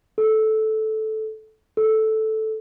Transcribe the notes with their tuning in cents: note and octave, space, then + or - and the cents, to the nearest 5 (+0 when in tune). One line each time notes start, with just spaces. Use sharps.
A4 -10
A4 -5